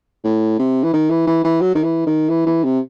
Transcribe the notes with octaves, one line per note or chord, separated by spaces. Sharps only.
A2
C3
E3
D#3
E3
E3
E3
F#3
D#3
E3
D#3
E3
E3
C3